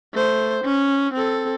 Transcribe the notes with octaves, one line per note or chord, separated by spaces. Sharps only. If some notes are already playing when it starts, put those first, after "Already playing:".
A3 C5
C#4
C4 A4